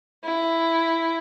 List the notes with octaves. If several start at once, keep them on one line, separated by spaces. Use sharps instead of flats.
E4